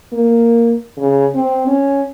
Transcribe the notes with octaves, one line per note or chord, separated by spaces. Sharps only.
A#3
C#3
C4
C#4